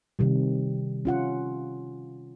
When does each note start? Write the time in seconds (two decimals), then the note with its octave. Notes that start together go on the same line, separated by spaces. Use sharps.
0.19 C3 D#3 G3
1.05 C#4 F4 F#5